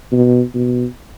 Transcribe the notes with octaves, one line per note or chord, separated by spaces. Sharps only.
B2
B2